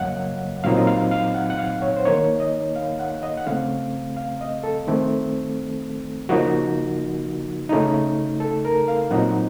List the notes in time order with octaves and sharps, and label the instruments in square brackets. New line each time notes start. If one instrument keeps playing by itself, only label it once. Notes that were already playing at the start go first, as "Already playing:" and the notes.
Already playing: [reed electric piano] F#2 C#3 F#3 A#3 C#5 D#5 F5 F#5
A#2 F#3 C4 D#4 F5
D#5
F5
F5
F#5
F#5
F5
C#5
C5
D#3 A#3 D#4 C#5
D#5
F5
F#5
D#5
F#5
C#3 A3 C4 F5
F5
D#5
A4
D#3 A3 C4
C#3 F3 A#3 D#4 F#4
C#3 A3 D#4
A4
A#4
F5
A#2 F#3 C4 D#4 F#5